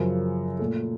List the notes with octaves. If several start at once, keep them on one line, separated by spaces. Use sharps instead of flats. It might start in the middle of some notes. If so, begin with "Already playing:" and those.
Already playing: F#2 C#3 F3 A#4
A#2 A3 A4